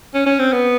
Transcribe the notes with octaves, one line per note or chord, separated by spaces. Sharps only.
C#4
C#4
C4
B3